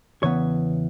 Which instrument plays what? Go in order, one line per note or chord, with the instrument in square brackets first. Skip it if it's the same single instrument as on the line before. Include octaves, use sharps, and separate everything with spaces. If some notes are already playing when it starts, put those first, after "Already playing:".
[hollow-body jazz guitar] E2 C#3 E3 B3 C#5